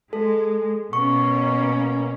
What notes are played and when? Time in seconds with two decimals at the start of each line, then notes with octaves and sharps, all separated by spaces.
0.13 G#3 A4
0.93 B2 A#3 C#4 C#6